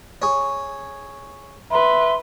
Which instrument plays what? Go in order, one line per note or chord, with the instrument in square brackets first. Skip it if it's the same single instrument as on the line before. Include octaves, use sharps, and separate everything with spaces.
[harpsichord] G#4 C#5
[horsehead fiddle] B4 [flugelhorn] E5 [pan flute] C6